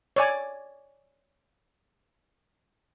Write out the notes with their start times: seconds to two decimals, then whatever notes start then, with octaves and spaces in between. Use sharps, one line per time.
0.16 C#5 D5 G#5